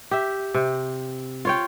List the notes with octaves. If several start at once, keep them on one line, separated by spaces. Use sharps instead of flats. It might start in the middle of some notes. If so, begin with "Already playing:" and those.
G4 E5
C3
F4 C#5 G5